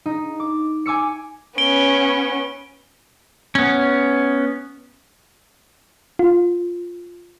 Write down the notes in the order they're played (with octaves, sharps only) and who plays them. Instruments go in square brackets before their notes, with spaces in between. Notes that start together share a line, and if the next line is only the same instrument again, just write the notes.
[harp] D#4
D6
G#5 D6 E6 C#7
[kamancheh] B3 C#4 [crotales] D7 G7
[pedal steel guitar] B3 C#4
[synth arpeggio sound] F4